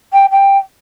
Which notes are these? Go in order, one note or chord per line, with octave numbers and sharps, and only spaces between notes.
G5
G5